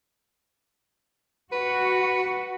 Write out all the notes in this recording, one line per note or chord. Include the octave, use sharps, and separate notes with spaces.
F#4 B4